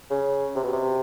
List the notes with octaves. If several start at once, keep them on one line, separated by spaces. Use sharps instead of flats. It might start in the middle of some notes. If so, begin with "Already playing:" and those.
C#3
C3
B2
C3